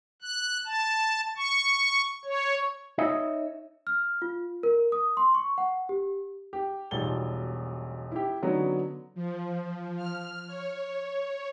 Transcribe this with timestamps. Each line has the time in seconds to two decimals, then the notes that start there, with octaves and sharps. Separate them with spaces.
0.22 F#6
0.66 A5
1.37 C#6
2.25 C#5
2.98 D#4 C#5 D#5 E5
3.87 F6
4.22 F4
4.63 A#4
4.92 D#6
5.17 C6
5.35 C#6
5.58 F#5
5.89 G4
6.53 G4
6.91 E1 B1 F3 G3 A6 G7
8.12 E4 G4
8.42 D3 F#3 B3 C#4 D#4
9.15 F3
9.97 F6
10.47 C#5